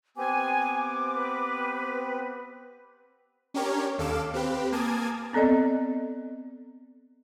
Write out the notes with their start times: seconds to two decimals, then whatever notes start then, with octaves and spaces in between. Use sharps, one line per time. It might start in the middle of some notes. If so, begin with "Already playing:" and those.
0.17 B3 C4 G4 G#5 D6
1.12 B4
3.54 C#4 D4 G4 A#4 C#5
3.98 D#2 A4 F5 D6 E7
4.34 C4 G4 B4
4.72 A#3 G#5 A5 D6 D#6 G#6
5.33 B3 C4 A4 D5 D#5